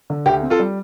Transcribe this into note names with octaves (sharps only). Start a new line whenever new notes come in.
D3
D2 G4
C4
F4 A4
G3